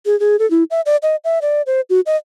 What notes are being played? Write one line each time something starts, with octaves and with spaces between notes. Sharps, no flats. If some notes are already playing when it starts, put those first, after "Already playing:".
G#4
G#4
A4
E4
E5
D5
D#5
E5
D5
C5
F#4
D#5